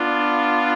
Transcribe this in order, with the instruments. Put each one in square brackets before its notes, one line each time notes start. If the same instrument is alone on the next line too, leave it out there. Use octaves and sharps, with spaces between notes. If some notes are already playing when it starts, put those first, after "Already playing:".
Already playing: [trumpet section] B3 D4 F4